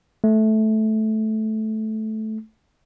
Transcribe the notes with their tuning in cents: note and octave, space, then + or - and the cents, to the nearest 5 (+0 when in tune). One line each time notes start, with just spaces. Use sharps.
A3 -10